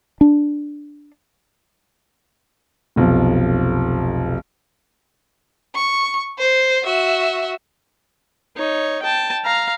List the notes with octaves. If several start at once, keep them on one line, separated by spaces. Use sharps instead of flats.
D4
F1 B1 F3
C#6
C5
F#4 E5
D#4 C#5
G5 A5
F5 A#5